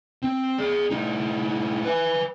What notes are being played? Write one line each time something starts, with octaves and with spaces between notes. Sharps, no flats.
C4
G#4 D5
A2 D#4
B4 G#5